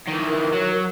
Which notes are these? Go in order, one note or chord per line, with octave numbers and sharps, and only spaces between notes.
D#3 E3
A#4
F#3